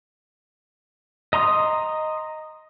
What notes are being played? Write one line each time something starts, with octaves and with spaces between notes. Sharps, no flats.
D#5 A#5 C6 D#6